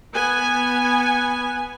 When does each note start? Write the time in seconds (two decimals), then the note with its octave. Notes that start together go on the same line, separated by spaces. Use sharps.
0.14 B3 G#5